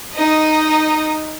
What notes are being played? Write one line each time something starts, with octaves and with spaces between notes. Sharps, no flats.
D#4 D#5